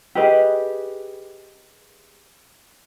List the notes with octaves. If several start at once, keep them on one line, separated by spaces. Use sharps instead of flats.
G4 G#4 B4 D#5